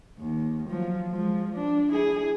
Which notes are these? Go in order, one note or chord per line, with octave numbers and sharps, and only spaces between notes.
D#2
F3 F#3
F3 G#3
D4
E4 G#4